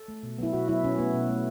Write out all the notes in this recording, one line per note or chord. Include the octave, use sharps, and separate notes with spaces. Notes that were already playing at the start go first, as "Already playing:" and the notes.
Already playing: A4
A3
B2
F#3 B3 E4
B2 F#4
F#3 B3 E4
B2 C#4
A3 B3
B2
A3